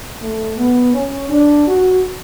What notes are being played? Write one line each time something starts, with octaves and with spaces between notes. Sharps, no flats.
A3
B3
C#4
D4
F#4